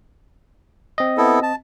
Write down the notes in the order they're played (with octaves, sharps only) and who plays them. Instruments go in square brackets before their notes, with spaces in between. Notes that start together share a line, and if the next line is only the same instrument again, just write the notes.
[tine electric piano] C4 D#5
[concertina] B3 E4 A4
A5